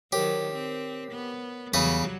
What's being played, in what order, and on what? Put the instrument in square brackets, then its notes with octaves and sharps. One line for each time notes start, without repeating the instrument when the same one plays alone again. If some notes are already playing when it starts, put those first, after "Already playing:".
[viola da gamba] D#3 F#3 [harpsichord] G4 [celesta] A#4 C5 C#5
[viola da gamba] C4
B3
[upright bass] E2 [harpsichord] C#3 B4 D#6 [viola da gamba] F#3 G3 F#4